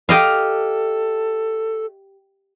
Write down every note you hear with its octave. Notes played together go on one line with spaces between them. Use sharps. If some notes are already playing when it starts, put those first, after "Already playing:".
G4 A4 D#5 F5